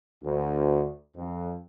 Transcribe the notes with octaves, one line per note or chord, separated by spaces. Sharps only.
D2
F2